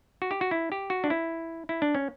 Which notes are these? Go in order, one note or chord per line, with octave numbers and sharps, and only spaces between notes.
F#4
G4
F#4
E4
G4
F#4
D4
E4
E4
D4
C#4